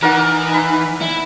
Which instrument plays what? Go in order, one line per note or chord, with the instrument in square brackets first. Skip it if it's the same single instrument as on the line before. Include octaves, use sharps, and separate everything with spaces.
[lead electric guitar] E3 [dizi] D#4 [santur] A#4 D5 F#5
[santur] B5
[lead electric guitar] E4